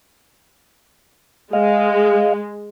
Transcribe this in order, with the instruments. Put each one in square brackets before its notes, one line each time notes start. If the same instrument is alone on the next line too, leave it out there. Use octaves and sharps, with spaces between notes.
[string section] G#3 [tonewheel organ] D#5 F5